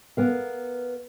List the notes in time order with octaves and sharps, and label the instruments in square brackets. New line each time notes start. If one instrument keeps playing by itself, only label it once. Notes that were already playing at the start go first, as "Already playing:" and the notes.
[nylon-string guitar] B3 A#4 F5